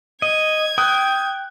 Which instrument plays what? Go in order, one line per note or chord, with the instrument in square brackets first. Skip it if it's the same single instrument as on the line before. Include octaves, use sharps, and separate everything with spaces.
[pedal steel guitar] D#5 [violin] G#6
[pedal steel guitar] G5 [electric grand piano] D#6 F#6